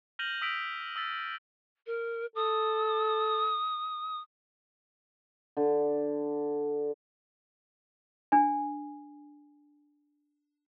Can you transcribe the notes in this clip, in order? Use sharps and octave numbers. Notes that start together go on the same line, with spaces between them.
F6 G6 A#6 D#7 F7 F#7
D#6 E6 B6 D7 F7
D#6 E6 A6 B6
A#4
A4 D#6
D3
D4 G#5